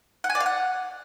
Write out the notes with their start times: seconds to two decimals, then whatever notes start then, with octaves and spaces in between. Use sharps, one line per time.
0.24 F#5
0.30 G#5
0.35 D5
0.40 F5
0.46 F#5